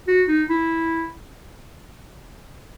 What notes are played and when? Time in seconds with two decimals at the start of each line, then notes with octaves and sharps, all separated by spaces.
0.07 F#4
0.28 D#4
0.49 E4